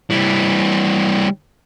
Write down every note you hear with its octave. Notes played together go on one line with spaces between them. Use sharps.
E3 G3